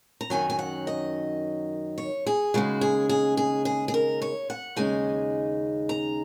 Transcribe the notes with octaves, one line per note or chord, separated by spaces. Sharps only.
A#5
F#2 D#3 F#3 G#5
G#5
F#5
D#5
C#5
G#4
D#2 C#3 G#3 F#4
G#4
G#4
G#4
G#4
G#4
A#4
C#5
F#5
D#2 C#3 G#3 D#4 G#5
A#5